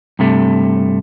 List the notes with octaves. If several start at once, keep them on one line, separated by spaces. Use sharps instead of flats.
G2 C3 A3